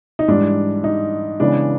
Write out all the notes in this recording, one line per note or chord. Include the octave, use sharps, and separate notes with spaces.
D#4
G#2 E3 G3 D4
D#4
C#3 E3 G#3 B3 D4